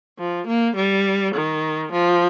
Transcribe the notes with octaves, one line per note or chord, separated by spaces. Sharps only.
F3
A#3
G3
D#3
F3